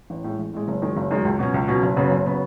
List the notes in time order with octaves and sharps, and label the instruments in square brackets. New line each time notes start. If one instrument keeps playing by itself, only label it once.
[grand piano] A1
A2 G#3
A1
A2 G#3
F#1
F#2 D#3 G#3
F#1
F#2 D#3 G#3
C#2
B2 F#3 C#4
C#2
B2 F#3 C#4
F#1
F#2 C#3 F#3 B3
F#1
C#3 F#3 B3